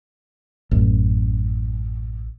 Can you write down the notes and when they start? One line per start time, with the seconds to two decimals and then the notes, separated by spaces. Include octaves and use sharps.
0.71 A1 F#2